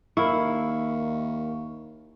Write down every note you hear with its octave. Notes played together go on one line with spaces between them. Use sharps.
D#2 E4 A#4 F5 C#6